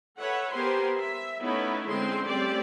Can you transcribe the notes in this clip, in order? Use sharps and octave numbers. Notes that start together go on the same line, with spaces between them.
A4 B4 C#5 E5 F#5
B3 G4 A#4 C5 G#5 C6
E5
A3 B3 C#4 D#4 E4
D3 G#3 C4 C#4 C6
G3 A3 C4 C#4 G4 D5